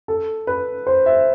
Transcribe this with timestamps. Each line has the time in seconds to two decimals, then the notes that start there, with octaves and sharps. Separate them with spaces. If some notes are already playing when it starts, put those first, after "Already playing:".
0.08 A4
0.47 B4
0.87 C5
1.06 E5